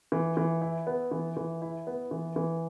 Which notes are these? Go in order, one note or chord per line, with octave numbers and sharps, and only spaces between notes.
E3
E3
E4
B3
E3
E3
E4
B3
E3
E3